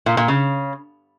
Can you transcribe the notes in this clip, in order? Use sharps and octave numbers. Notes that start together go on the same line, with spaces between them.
A#2
A#2
C#3